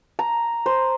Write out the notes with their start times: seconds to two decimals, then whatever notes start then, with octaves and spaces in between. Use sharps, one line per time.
0.19 A#5
0.66 C5